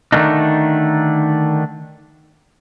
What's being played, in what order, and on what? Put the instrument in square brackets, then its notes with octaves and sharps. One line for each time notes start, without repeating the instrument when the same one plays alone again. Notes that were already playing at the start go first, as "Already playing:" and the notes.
[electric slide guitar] D3 D#3 A3 A#3 D4 D#4